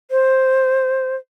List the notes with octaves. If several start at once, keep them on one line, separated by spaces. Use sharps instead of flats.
C5